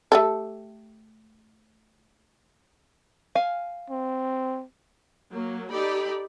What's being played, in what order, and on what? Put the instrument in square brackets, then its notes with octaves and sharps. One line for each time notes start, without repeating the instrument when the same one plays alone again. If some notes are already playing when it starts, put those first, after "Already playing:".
[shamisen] A3 G4 A4
[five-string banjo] F5 G#5
[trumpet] C4
[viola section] F#3 A#3
D#4 G4 A4 D5 B5